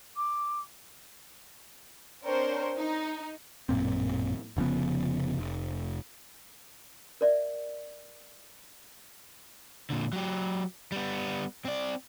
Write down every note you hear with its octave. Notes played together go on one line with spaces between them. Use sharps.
D6
C4 D4 A#4 C5 C#5
D#4
A1 F#2 A#2 C4
F1 C#3 F3 B3
F1
A#4 D5 E5
A#2 D3
F#3 G4
G3 B3
C4 D5